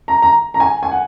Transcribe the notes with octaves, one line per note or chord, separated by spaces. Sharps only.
A#5
A#5
A#5
G#5
G#5
F#5